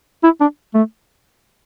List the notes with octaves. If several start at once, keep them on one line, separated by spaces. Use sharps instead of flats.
E4
D4
A3